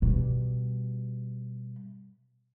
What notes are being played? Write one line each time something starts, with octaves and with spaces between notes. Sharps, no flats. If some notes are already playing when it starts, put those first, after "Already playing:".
B2 G3